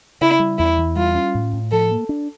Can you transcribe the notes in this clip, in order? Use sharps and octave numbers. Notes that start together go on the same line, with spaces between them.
C#3 E4
G3
E2 E4
E2
G3 F4
C#4
A2
A2
F3 A4
A#3
D4